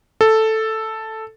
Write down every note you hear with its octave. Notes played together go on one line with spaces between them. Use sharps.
A4